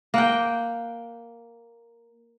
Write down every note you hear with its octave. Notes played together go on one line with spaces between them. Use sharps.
A#3 F#5 G5